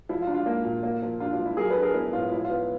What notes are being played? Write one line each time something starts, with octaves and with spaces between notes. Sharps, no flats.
F3 E4
F4
D4
F4
A#3
A#2
A#3
F3
D4 F4
F4
F3
E4
F#3 G#4 A#4
A4 B4
D4
G#4 A#4
B3 E4
A2 F4
F3 E4
F4
B3